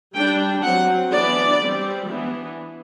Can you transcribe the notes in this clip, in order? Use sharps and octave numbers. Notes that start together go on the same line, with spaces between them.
G3 D4 G5
F#3 C4 F#5
E3 B3 D4 D5
G3 C4
E3 B3 D4